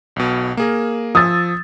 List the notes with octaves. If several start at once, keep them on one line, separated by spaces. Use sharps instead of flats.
B1 B2
A#3 G#4 A#4
F3 D#6 E6 A6